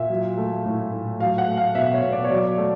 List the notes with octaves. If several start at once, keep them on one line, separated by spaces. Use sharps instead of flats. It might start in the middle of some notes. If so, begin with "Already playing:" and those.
Already playing: A#2 E5
F#3
A3
A2
A2
F#3 F5
F#5
A3
F5
B2 E5
C#5
B2
D5
C#5
F#3
D5
A3